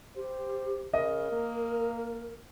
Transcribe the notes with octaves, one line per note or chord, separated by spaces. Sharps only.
G4 C5
C#3 A#4 D#5
A#3